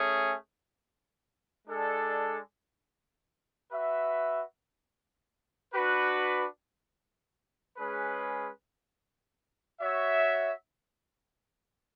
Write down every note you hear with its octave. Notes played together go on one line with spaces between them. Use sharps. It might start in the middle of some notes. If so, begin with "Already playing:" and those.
Already playing: A3 C#4 G#4
G#3 D4 A4 D5
F#4 B4 E5
D4 F#4 B4
G#3 C#4 G#4 B4
F#4 C#5 E5